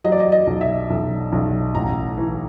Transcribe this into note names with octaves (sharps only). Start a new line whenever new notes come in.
F#3 D#5
D5
D#5
D#5
B1
E5
B1
B1
A1 A#5
E3